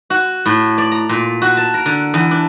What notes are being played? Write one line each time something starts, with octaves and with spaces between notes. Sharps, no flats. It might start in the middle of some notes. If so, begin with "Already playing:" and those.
F#4
A2
D5
A#5
A#2
F#4
A5
A#4
D3
E2
D4